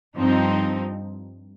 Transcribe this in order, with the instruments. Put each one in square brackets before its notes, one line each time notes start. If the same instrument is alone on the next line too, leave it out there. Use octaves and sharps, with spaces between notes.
[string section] G2 F3 C4 D#4